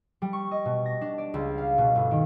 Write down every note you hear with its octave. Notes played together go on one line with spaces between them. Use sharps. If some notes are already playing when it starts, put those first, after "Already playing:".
G3
C#6
D#5
B2
A#6
D4
D5
C#2
F5
B2
G1
D#3